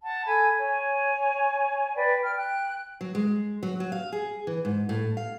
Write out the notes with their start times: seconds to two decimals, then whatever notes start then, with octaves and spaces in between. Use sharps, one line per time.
0.04 F#5 A5
0.26 A4 G#5 B5 G#6
0.58 C#5 G#5
1.95 B4 D5 G5
2.22 G5 F6
2.36 G5 F#6
3.01 F#3
3.15 G#3
3.63 F#3
3.80 F#3
3.92 F5
4.12 G#4
4.47 E3
4.65 G#2
4.89 A2
5.17 F5